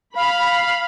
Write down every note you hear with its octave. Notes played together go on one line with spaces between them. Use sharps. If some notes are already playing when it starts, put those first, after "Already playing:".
F5 B5